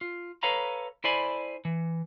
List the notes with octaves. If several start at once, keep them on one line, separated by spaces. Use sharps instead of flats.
F4
A4 B4 C#5 F5 A#5 B5
E4 A4 C5 D5 G#5 B5
E3